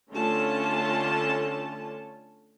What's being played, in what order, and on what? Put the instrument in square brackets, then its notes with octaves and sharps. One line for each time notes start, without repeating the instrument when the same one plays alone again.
[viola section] D3 A3 C#4 F4 A5